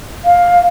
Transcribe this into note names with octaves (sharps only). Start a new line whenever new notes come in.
F5